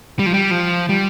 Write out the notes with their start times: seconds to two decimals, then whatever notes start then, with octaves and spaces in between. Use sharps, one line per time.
0.19 G3
0.26 F3
0.34 G3
0.51 F3
0.89 G3